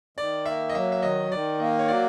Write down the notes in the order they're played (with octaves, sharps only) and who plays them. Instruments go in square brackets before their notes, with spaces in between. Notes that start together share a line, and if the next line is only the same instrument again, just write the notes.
[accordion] D#3 [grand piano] D5
[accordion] A#3 [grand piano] E5
[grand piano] D#5
[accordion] F#3 [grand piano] E5
[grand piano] E5
[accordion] D#3 [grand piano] D#5
[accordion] D#3 [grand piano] D5
[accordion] A#3 [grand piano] D#5
[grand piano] C#5
[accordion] F#3 [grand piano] D5